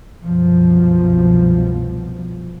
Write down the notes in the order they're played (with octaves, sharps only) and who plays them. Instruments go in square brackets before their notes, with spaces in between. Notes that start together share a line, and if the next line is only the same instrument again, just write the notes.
[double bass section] C2 F#2 B2 F3